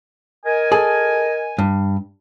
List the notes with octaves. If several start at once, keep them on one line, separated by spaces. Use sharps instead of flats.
A#4 D#5 G#5
G#4 A4
G2